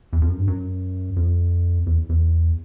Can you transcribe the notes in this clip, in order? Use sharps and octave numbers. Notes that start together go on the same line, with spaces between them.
E2
F2
F#2
G2
F#2
F2
E2
E2